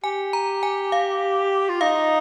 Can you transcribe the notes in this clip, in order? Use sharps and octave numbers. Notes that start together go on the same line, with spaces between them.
G4 G#5
A#5
G#5
F5
F4
D#4 F5